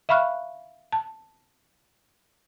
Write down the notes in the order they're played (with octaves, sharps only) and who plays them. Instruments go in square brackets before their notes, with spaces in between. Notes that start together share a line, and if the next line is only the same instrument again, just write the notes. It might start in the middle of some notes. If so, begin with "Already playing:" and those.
[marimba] E5 F5 B5 C#6 F6 F#6
A5